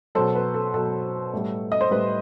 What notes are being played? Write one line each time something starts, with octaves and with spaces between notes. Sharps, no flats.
B2 F#3 A4 C5
B4
A4
B2 F#3 A4
A2 G3
D#5
C5
A2 G3 B4